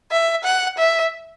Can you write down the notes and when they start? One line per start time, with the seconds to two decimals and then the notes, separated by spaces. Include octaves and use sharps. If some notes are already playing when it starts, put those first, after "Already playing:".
0.12 E5
0.44 F#5
0.78 E5